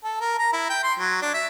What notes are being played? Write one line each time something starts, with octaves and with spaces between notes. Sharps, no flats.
A4
A#4
A#5
E4
G5
C6
F#3
D4
E5